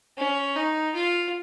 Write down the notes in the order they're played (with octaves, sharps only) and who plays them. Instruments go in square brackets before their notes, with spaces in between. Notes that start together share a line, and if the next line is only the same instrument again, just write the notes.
[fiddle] C#4
D#4
F4